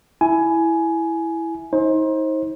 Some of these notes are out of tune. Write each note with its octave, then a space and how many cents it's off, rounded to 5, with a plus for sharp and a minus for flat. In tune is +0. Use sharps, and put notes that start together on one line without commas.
E4 +0 G#5 +15
D#4 +35 C5 +30